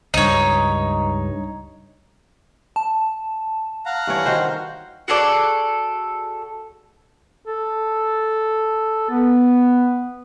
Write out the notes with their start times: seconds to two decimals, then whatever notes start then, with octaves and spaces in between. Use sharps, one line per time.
0.14 C#2 G2 D#4 C#5
2.76 A5
3.86 F5 F#5 A#5
4.07 G2 E3 C#5
4.26 D#3 F#4 C5
5.08 F#4 G#4 A4 D5
7.46 A4
9.10 B3